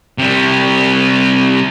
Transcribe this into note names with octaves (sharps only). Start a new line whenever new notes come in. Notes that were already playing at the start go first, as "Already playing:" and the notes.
C3 G3